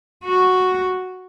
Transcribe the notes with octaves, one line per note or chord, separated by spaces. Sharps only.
F#4